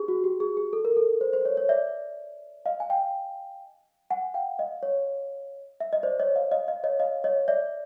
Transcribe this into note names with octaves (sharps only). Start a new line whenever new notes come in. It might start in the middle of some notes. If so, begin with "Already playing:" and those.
Already playing: G4 G#4
F#4
G4
G#4
G#4
A4
A#4
A4
C5
C5
C#5
C#5
D5 E5
D#5 F5
G#5
F5 G5
F#5 G#5
F5 G5
D#5 F5
C#5
E5
D#5
C5 D5
C#5 D#5
D#5 F5
D#5 F5
D#5 F5
C#5 D#5
D#5 F5
C#5 D#5
D5 E5